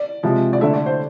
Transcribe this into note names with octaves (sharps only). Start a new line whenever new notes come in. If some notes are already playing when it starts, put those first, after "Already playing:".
Already playing: D5
C3 F3 G#3
D5
D3 A3 E5
D5
C5